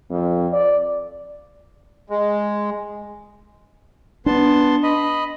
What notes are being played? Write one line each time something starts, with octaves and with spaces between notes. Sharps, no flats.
F2
D5
G#3
B3 D4 A5 C6
D#5 B5